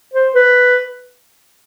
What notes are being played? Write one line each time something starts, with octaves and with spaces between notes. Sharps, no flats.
C5
B4